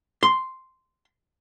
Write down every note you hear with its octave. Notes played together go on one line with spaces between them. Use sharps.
C6